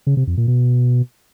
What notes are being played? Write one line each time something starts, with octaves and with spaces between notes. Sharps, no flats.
C#3
C3
F2
A#2
B2